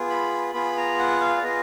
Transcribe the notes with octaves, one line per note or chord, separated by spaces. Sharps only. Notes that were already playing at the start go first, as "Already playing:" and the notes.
Already playing: B3 F4 G#4
B5
B3 F4 G#4 B5
A#5
F#5
F5
D5
B3 F4 G#4 D#5